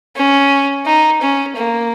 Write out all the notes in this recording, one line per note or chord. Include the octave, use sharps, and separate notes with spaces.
C#4
D#4
C#4
A#3